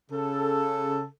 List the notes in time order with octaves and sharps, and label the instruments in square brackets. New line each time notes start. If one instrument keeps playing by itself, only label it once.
[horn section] C#3 A4